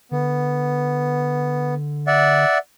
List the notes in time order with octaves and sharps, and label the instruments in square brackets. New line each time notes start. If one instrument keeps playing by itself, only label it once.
[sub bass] D3 [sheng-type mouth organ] B3
[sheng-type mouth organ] D5 E5 F#5